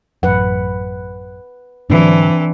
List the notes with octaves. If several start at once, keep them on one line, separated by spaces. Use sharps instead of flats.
A1 F#2 B4 F#5
G#2 D3 E3 F#3 C4 D4